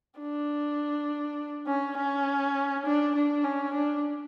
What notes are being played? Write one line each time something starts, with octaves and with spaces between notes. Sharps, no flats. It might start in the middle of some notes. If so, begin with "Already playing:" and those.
D4
C#4
C#4
D4
D4
C#4
D4